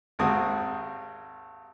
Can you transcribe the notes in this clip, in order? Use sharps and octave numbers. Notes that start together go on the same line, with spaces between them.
G#1 D#2 G#3 C4 F#4 D#6